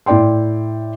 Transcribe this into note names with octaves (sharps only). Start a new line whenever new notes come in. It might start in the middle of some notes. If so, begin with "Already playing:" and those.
A2 E4 D5 G5 C6